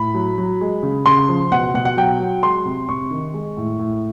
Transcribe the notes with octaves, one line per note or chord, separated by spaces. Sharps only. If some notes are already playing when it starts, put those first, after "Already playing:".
Already playing: A2 B5
F#3
F#3
G#3
C#3
C#3 C6
F3
B2 F#5
B2 F#5
F#5
F#3 G5
F#3
G#3 C6
C3
C3 C#6
D#3
G#3
A2
A2